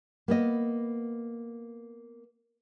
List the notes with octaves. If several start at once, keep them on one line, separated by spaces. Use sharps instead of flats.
A#3 B3 D#5